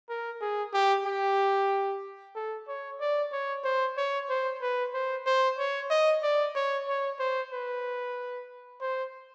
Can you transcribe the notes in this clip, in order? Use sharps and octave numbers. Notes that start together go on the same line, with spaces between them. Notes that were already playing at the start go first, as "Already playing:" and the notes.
A#4
G#4
G4
G4
A4
C#5
D5
C#5
C5
C#5
C5
B4
C5
C5
C#5
D#5
D5
C#5
C#5
C5
B4
C5